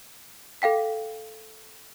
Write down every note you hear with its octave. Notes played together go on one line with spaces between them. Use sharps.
A4 F5 G5 B6